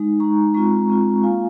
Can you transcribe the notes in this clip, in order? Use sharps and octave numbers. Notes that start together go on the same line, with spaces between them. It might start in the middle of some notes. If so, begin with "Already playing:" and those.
Already playing: G#3 D#4
G#3 D#4 A#5 C#6
G#3 C4 F4 A#5 C#6
G#3 C4 F4
A#3 F4 F5 G#5